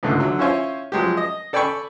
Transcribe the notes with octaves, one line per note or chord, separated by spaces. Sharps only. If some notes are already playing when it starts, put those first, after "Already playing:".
C#2 G#2 D3 A3
D3 F#3
C#4 E4 F4 C5 C#5 G#5
F3 F#3 G#3 G4
D#5
A4 D5 G5 G#5 B5 C#6